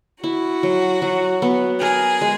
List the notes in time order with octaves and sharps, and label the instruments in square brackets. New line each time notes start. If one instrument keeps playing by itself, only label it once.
[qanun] E4 [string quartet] F#4
[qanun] F#3
F#3
B3
[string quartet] G#4 [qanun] A#4
[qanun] G#3